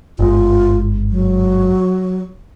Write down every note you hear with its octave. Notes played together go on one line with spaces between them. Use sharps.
G1 G#2 F4
F#3